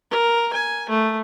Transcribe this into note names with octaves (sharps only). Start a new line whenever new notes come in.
A#4
G#5
A3